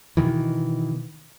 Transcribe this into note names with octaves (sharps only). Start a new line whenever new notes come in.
B2 D#3 E3